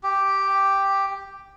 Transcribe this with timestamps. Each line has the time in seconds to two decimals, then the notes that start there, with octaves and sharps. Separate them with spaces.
0.03 G4